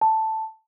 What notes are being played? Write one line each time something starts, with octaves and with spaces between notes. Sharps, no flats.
A5